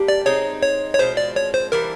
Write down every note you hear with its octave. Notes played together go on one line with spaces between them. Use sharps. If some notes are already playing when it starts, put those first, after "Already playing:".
Already playing: G3 A#3 D4 G4
D5
G#3 C4 D#4 C#5
C#5
C#5
B2 G#3 C4 F4 C5
D5
C#5
C5
E3 G3 A#3 D4 A#4